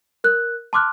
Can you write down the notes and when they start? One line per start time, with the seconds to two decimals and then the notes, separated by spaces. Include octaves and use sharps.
0.24 A#4 F#6
0.73 A5 C6 D6 F6 F#6